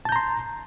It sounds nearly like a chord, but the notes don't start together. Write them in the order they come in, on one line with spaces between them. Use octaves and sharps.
A5 G6 A#5 C6